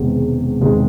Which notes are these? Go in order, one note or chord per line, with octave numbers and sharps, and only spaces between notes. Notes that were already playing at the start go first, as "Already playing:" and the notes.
Already playing: E1 E2 C3 D#3 G#3
E1 E2 C3 D#3 G#3